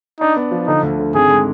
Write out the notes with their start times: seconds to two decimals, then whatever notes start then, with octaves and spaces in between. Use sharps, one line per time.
0.20 D4 D#4
0.36 B3
0.51 F3
0.67 D3 D#4
0.83 D2
0.99 D3
1.14 G#1 G#4
1.30 G#3